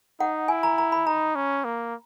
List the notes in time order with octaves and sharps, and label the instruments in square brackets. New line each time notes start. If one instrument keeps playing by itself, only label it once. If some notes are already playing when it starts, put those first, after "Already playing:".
[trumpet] D#4 [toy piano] F#5
[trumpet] E4 [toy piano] G#5
[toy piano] A#5
A#5
B5
[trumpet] D#4 [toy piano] A#5
[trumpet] C#4
A#3